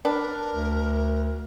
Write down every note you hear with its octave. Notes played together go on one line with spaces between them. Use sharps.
D4 A#4 B4
D2